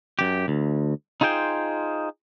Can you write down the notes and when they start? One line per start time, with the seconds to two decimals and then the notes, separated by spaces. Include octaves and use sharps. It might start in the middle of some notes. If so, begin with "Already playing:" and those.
0.19 F#2 G4
0.48 D2
1.21 D#4 F4 G#4 C5 G5